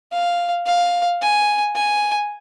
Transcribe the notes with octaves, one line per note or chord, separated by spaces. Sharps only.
F5
F5
G#5
G#5